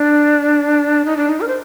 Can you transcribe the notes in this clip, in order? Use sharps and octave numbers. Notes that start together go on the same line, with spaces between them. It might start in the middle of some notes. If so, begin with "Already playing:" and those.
Already playing: D4
D#4
D4
D#4
A#4
C5